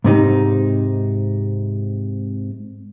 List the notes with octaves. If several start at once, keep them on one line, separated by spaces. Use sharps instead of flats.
G#2 C3 D#4